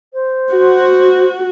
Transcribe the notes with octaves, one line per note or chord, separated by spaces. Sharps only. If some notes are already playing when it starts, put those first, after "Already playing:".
C5
F#4